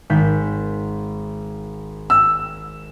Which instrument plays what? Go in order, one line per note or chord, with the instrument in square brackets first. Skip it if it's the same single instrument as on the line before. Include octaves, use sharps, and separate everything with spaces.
[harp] G#1 G6 B6
[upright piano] E6